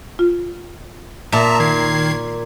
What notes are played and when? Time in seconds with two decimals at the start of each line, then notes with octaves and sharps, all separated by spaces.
0.19 F4
1.32 A#2 E5 A5 A#5
1.60 D#3 G#6 C7